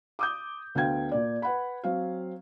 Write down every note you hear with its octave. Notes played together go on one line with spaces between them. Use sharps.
D6 D#6 G6
D2 B3 F5 G5 G#6
A#2 D5
B4 F#5 B5
F#3 C4 F5